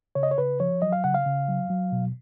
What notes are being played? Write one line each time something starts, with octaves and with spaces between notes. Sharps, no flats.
C#3 C#5
D#5
C#5
C#3 B4
F3 C#5
F#3 D#5
F5
C#3 F#5
F5
C#3
F#3
F#3
B2